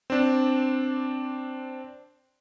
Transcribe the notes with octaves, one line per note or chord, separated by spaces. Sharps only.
C4 D4